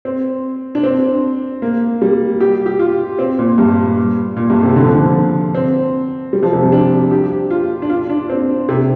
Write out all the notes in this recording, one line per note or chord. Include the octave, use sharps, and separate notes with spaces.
C4
D4
C4
A#3
G3
G4
G4
F4
C4
A#2
G2
A#2
G2
C3
D3
F3
D3
C4
G3
F3
C3
G3
D4
G4
F4
D4
F4
D4
C4
C3